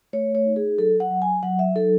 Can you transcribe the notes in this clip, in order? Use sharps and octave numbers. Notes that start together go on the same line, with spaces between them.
A3 C#5
C#5
D#4
G#4
F#3 A4
F#5
F#3
G#5
F#3 F#5
E5
D#4 A4